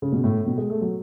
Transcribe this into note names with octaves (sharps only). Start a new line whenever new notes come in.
C#3
B2
A2
B2
G#3
A3
F#3